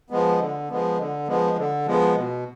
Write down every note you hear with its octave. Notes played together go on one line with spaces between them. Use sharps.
F3 G#3 B3
D3
F3 G#3 B3
D3
F3 G#3 B3
D3
F3 G#3 B3
B2